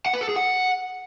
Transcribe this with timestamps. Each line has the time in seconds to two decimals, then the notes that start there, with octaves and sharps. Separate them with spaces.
0.06 F#5
0.13 B4
0.21 A4
0.29 G#4
0.36 F#5